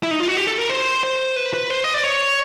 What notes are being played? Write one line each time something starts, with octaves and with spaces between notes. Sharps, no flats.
E4
D#4
F4
F#4
G4
A4
A#4
C5
C5
B4
B4
C5
D#5
D5
C#5